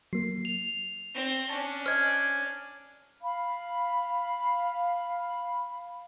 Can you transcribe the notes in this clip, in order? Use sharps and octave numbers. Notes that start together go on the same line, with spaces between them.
F#3 A#3 C7
F7
C4
C#4 D4 A5
C5 D#5 G#5 F6 G#6
F5 B5